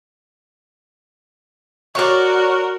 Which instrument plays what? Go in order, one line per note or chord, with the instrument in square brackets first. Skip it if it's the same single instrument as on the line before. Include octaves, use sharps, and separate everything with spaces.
[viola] F#4 A#4 [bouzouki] C#5 D5